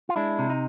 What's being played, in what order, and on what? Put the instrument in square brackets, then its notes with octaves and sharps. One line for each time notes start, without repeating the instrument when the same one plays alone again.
[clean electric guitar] F4
G#3 D4 E4
C3
D#4